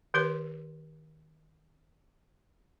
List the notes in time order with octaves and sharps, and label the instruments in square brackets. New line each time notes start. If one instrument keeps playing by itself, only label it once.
[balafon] D#3 G4 B4 C#5 C6